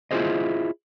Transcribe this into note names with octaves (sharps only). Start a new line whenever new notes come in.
E4 F4 G4 G#4 C5 D#5